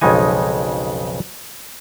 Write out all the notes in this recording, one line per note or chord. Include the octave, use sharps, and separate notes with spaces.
B1 F2 C#3 G#3 D#4 G#5